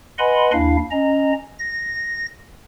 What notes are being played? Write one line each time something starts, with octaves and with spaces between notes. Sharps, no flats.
B4 D#5 F#5 G#5 B5 C6
D#2 D4 E4 F5
C#4 D#5 A#5
A#6